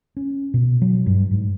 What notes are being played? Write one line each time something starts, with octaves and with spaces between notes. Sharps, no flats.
C#4
B2
F#3
G2
G#2